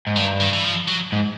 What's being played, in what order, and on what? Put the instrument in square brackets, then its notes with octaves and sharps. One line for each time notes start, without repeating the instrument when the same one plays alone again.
[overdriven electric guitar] G#2
[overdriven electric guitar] G2 [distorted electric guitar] D#3
[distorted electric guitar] D#3
E3
F3
F#3
[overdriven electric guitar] G#2